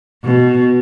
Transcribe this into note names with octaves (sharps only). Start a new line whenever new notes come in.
B2